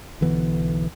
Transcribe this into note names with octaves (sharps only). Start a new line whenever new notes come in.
B1 D3 E3 B3